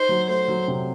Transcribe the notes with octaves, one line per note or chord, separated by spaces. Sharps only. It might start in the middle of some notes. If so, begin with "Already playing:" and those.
Already playing: D#4 C5
F#3
A3 C5
F#3
C3